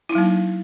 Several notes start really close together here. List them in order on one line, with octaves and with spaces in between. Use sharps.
E4 D#4 F#3 A#3